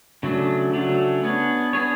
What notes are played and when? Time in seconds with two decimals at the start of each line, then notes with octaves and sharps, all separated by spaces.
0.23 C#3 F#3 A3 D4
0.73 C#3 F#3 A3 D4
1.24 B3 D4 G#4 C#5
1.73 B3 D4 G#4 C#5